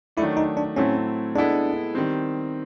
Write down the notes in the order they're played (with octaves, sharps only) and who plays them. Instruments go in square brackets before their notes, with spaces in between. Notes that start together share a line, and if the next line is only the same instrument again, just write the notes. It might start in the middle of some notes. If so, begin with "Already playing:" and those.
[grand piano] D#3 F#3 A3 D4 [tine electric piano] E4
[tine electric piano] D#4
D4
[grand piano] A2 F#3 A3 C4 E4 [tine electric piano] C#4
[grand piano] G#3 B3 E4 A4 [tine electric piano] D4
[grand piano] D#3 G3 C4